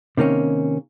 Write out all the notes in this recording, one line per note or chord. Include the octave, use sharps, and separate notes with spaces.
C3 D#3 A#3 C#4